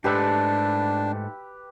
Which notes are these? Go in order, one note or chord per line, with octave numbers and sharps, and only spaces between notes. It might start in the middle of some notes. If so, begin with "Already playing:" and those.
G#2 A3 D4 G4 B4 E6